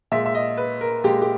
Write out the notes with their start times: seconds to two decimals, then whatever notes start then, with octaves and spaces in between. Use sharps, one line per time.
0.12 A#2 G#3 E5
0.26 E5
0.35 D#5
0.57 B4
0.81 A#4
1.04 A#2 G#3 G4
1.22 G4